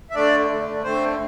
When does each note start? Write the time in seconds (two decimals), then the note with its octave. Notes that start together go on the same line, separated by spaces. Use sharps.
0.11 E5
0.15 D3 A3 D4 D5
0.50 D3 A3
0.84 D3 A3 C4 C5